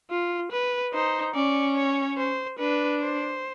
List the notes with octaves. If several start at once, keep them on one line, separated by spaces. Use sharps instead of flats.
F4
B4
D#4 C5
C#4 D5
C#5
C5
D4 B4
C5